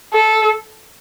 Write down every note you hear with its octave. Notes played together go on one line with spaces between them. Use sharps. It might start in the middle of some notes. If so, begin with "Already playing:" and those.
A4